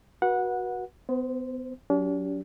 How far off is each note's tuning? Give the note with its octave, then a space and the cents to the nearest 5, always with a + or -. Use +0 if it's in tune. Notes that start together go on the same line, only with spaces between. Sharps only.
F#4 +0 B4 -35 F#5 -15
B3 +35 C5 -10
F#3 +5 D4 -45 G4 +0